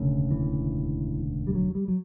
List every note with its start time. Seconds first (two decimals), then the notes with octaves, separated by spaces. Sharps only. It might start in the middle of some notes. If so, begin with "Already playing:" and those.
Already playing: E1 D2 C#3
0.31 E3
1.47 G3
1.55 F#3
1.75 G3
1.88 F#3